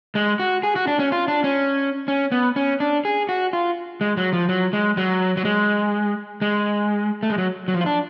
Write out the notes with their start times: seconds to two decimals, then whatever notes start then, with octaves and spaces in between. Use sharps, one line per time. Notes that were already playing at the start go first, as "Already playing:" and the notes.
0.15 G#3
0.40 F#4
0.63 G#4
0.76 F#4
0.87 D4
0.99 C#4
1.12 F4
1.28 D4
1.44 C#4
2.08 C#4
2.32 B3
2.56 C#4
2.80 D4
3.05 G#4
3.29 F#4
3.53 F4
4.01 G#3
4.17 F#3
4.33 F3
4.49 F#3
4.73 G#3
4.97 F#3
5.37 F#3
5.45 G#3
6.42 G#3
7.23 A3
7.30 G#3
7.38 F#3
7.68 F#3
7.74 F3
7.81 F4
7.86 D4